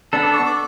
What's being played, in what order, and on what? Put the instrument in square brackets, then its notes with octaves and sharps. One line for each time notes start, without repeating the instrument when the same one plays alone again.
[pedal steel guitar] B3 D4 A4 [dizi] E6
[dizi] D6
C#6
D6